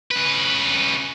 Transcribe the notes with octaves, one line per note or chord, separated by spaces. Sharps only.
C#3 B4